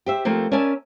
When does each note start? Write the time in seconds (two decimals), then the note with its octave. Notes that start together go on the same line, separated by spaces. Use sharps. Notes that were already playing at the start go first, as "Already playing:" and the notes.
0.06 G4 C5 E5
0.25 F3 A3 A#3 C4
0.52 C#4 A#4 D5 E5 G#5 A5